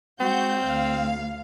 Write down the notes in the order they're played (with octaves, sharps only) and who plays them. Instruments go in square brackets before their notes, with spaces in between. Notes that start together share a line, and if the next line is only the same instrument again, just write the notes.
[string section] G#3 F#4 G6 [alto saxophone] C4
[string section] D2 F5